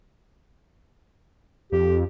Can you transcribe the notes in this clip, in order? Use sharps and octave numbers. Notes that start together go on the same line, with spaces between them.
F2 G4